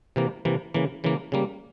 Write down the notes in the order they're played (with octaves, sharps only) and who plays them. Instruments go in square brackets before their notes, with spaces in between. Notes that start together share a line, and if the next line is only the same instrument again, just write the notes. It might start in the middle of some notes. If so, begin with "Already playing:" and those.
[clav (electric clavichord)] C3 E3 A#3
C3 E3 A#3
C#3 E3 A#3
C#3 E3 A#3
C#3 G3 A#3